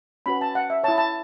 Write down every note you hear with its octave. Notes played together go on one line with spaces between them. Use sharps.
C#4 F#4 B4 B5
A5
F#5
E5
E4 C#5 A5
A5